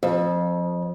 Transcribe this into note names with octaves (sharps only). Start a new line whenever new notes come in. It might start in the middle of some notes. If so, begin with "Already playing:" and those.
F2